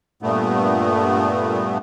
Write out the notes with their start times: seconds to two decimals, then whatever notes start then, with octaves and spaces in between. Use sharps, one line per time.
0.22 G2 A#2 A3 B3